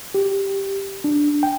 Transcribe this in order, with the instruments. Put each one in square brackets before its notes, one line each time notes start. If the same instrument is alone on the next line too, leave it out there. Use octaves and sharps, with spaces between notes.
[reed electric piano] G4
D4
G5